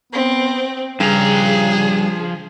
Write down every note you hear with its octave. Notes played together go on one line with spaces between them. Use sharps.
B3 C4
G2 C#3 F3 G#4 A#5